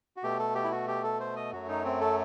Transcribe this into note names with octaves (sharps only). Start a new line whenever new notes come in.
F#4
B2 A3 G4
A4
G4
E4
F#4
G4
A4
C5
D#5
F#2 F#3 A3 F#4
D#4
C4
A4